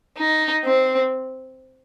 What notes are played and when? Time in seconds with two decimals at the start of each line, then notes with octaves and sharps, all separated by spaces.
0.17 D#4
0.64 C4